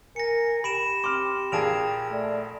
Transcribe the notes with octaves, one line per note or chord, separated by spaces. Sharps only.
A#4 G#5 A#6 C#7
G4 B5 D7 E7
C4 C6 D6 F6
A#1 A#3 G#4 G5 A5 D7 F7
A3 D5